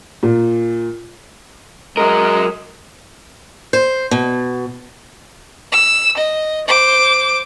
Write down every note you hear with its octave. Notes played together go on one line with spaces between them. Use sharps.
A#2
F#3 G#3 A#4
C5
B2
E6
D#5
C5 D6